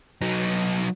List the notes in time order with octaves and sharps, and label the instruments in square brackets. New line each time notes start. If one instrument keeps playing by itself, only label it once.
[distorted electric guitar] F#3 D#4